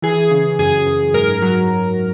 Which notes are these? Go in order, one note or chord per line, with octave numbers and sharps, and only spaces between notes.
E3 G#4
C#3
F#2 G#4
F#2
G#2 A#4
F#3